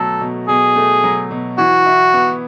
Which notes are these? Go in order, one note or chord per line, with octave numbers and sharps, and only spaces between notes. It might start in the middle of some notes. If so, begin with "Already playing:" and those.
Already playing: B2 F#3 A3 A4
B2
B2 G#4
A3
F#3
B2
E3 F#4
E4
B3